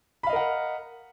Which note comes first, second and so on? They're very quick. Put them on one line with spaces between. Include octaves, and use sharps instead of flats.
B5 F5 D#5 A#4 F#5